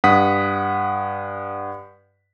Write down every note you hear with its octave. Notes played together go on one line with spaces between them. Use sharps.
G2 F#5 D#6 B6